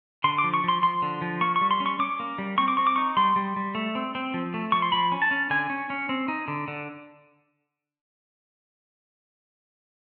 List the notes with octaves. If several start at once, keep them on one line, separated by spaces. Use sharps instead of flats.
D3 C6
D6
F3
C#6
F3 C6
F3 C6
D3
F3
A#3 C#6
C#6
G3
C6
C#4
C#6
C#4 D6
A#3
G3
C4 C#6
D6
C4 C#6
D6
D#4 C#6
G3 C6
G3
G3
A3
C4
C4
F3
A3
F3 C#6
C6
F3 B5
C#4
A5
C#4
D3 G#5
C#4
C#4
C4
D#4
D3
D3